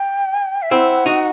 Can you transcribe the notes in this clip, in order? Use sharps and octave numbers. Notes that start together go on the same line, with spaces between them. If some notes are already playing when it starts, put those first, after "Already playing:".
Already playing: G5
E5
C4 E4 F#5
D#4 F#4